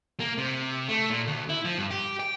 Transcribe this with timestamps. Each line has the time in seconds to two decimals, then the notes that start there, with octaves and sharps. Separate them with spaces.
0.20 A#3
0.38 C3
0.89 A3
1.10 A#2
1.27 D2
1.49 E4
1.65 F3
1.78 G2
1.90 G4
2.20 G5